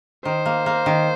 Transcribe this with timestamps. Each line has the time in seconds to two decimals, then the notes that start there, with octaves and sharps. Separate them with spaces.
0.25 D#3 C5
0.46 A#3
0.66 A#3
0.86 D#3